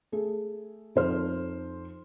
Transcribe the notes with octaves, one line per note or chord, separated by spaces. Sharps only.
A3 G#4 A4
F2 D#4 A4 C5 C6 F6